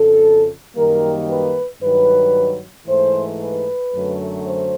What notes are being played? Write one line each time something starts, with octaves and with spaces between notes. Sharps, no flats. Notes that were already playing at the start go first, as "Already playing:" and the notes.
Already playing: F2 C#3 F3 A4
F#2 D#3 G3 A#3 A#4
B4
G2 D#3 F#3 B4
G#2 E3 A3 C5
B4
F#2 D3 F#3 A3
C5